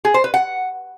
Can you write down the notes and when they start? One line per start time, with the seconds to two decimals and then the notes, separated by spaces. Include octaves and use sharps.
0.05 G#4
0.14 C5
0.24 B4
0.34 F#5